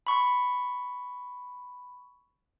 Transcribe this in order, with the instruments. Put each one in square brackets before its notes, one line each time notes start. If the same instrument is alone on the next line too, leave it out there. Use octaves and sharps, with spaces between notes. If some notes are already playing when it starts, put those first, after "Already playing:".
[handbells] B5 C#6